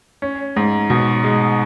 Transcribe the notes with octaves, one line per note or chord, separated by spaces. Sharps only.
C#4
G#2
B2
G#3